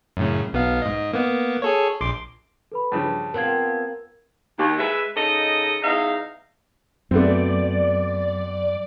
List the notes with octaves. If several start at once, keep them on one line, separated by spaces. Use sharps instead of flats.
F#2 A2 C#3
B1 B3 F5
G#2 D#5
A#3 B3
G#4 A4 C#5
A#1 C6 D6
A4 B4 B5
G2 C#3 F3 A5
B3 C4 F4 A#4 G#6
D#2
G#3 B4 E5
C#3 D#4 A4 D#5
E2 D#4 E5 F5
F#2 A3 B3 C4 D5